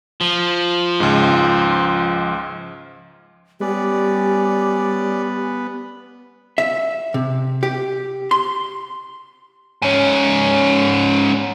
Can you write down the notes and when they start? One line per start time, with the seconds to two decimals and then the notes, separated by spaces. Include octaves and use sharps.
0.21 F3
1.00 C#2 G#2
3.61 G3 B3 C#4 G4 D5
6.58 E5
7.14 C3
7.63 G4
8.31 C6
9.82 G#2 C#4